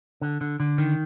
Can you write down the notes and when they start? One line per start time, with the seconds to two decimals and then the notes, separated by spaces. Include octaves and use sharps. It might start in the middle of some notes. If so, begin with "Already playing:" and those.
0.21 D3
0.41 D3
0.60 D3
0.78 D#3